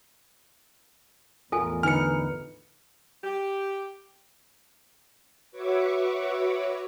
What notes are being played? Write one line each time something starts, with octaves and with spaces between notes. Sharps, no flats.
A1 E2 F4 A4 A#4 G#5
D3 D#4 B4 G#5 F6 C#7
G4
F#4 B4 C#5 E5 C#6 D6